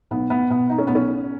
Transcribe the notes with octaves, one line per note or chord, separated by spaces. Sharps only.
B1 B3
B3
B2 B3
D#4
C#4
B1 B3
C#4